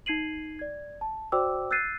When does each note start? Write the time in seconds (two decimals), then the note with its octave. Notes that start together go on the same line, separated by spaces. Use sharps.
0.06 D#4 G#6 C7 D#7 F#7
0.59 D5 G#6
1.01 A5
1.32 F#4 C5 D5 G5 D6 E6
1.71 E6 F#6 G6 A6 C7 D#7